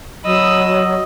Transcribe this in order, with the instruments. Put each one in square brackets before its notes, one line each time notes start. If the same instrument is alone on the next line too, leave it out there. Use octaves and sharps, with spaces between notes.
[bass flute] F#3 [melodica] D#5 [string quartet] B5 D#6 E6